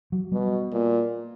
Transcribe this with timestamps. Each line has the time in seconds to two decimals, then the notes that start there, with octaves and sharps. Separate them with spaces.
0.12 F#3
0.32 B2 G3
0.73 A#2